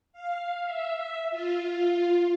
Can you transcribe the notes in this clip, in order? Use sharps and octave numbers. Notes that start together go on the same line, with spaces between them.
F5
E5
F4